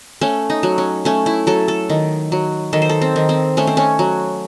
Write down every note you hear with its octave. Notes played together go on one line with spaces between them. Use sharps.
A3 C#4
D#4
F#3
C#4
A3 C#4
E4
F#3 A4
A4
D#3
F#3
D#3 A4
C5
A4
C4
D#3
C4
A3 C#4
C4
C#4
F#3